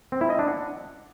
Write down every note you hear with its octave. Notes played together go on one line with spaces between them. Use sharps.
C4
E4
D#5
D4
F#5